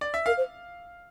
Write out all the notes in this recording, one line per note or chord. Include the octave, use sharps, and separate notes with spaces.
D5
E5
A#4 F5
C5